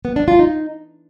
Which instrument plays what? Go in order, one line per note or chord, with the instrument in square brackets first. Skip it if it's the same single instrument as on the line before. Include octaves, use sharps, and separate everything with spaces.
[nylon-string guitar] B3
D4
F4
D#4